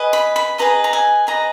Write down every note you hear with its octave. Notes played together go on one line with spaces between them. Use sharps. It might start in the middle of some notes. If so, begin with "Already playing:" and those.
Already playing: G#4 B4 D#5
B5
B5
G#4 B4 D#5 A#5
A#5
G#5
G#4 B4 D#5 A#5